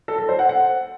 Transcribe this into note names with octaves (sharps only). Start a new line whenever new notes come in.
A4
A4
C5
F#5
F#5